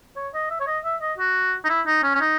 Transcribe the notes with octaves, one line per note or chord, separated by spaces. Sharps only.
C#5
D#5
E5
C#5
D#5
E5
D#5
F#4
D#4
E4
D#4
C#4
C#4
D#4